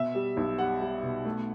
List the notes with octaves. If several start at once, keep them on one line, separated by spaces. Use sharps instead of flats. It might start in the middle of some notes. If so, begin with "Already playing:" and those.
Already playing: B2 E5
G3
B1
G3 F#5
G3
B2
A3